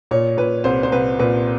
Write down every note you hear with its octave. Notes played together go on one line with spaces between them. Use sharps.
A#2 C#5
A#2 B4
C2 C5
C5
C2 B4
A#2 B4